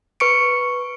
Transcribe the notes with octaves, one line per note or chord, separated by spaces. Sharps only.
B4 C#6 C#7 D7